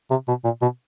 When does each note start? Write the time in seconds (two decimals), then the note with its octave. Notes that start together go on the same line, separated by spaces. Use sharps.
0.11 C3
0.28 B2
0.44 A#2
0.62 B2